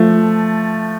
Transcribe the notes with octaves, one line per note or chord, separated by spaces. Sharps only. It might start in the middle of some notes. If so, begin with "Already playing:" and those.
Already playing: F3 A3